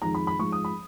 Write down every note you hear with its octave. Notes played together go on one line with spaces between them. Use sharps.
F2 D#3 G#3 A#5
B5
B5
G#2 F3 G#3 C#6
D#6
B5